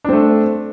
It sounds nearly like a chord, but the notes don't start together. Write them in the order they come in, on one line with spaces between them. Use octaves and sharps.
D4 C4 A3